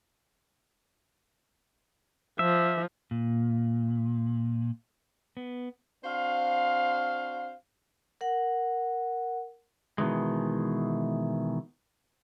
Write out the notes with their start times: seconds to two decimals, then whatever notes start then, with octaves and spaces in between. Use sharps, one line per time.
2.39 F3 E5
3.11 A#2
5.37 B3
6.04 C4 D4 F#4 C5 F5
8.21 A#4 F#5
9.98 B2 D#3 E3 G#3